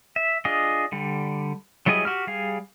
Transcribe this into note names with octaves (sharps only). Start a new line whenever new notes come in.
E5
D4 F4 G#4 D#5
D3 G3
F#3 G3 E4 G#4 D#5
F#4 G4 F6
G3 G#4 F5